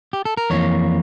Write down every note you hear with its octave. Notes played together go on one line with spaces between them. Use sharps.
G4
A4
A#4
F2 E3 A#3 C#5